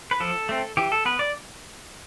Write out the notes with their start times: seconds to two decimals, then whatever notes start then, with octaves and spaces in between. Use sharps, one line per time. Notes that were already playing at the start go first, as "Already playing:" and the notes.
0.11 B4
0.20 F3 A4
0.49 A3 C4
0.77 E3 G4
0.92 A4
1.05 B3 B4
1.19 D5